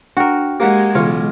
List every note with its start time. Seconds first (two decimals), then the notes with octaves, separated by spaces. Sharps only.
0.17 D4 F#4 A#4 G5
0.60 G#3 A#3 G4 F#5
0.95 B1 C#3 E3 F4 C#5